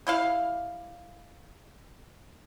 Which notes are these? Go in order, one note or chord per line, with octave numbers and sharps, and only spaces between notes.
G3 E4 F5